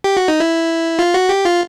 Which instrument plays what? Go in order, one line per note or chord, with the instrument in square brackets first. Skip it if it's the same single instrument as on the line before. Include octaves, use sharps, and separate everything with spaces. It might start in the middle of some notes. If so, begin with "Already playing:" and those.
[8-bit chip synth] G4
F#4
D#4
E4
F4
F#4
G4
F4